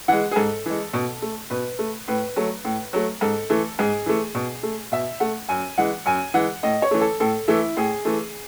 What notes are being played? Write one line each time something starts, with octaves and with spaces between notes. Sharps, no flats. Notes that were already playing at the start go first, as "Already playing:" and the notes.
E3 G#3 F#5
G#4
G#2 A4
E3 G#3
B2
A3
B2 B4
A3
A2 B4
F#3 A3
A2
F#3 A3
G#2 A4
E3 A3
G#2 G#4
E3 A3
B2
A3
B2 E5
A3 F#5
F#2 G#5
E3 G#3 F#5
F#2 G#5
E3 G#3 F#5
A2 D#5
C#5
E3 A3
A4
A2 A4
E3 A3 E4
A2 G#4
E3 A3